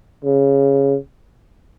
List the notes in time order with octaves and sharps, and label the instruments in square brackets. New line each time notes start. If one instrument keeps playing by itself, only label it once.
[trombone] C#3